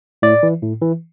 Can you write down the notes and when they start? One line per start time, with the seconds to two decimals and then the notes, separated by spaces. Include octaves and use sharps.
0.22 A2 D5
0.43 E3
0.62 A2
0.81 E3